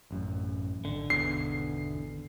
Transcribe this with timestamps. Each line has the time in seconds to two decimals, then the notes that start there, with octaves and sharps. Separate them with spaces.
0.11 A1 F#2
0.85 G#1 D3
1.10 E2 B2 C7